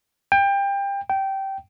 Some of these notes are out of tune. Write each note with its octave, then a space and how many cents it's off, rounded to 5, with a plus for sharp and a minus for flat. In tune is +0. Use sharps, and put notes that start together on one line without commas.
G5 +25
G5 -15